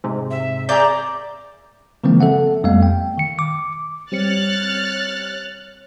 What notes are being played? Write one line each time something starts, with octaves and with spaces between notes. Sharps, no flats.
G#2 C3
E5
G#4 D5 E5 A#5 G6
C#3 E3 F3 G#3 A#3 C4
A4 E5 F#5
F2 G3 A3 B3 F5
G5
D#3 C#7
D6
G3 C4 C#5 F6 F#6 A6 C#7